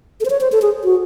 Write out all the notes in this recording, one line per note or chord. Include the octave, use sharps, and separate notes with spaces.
A4
C5
C#5
C5
A4
G#4
F#4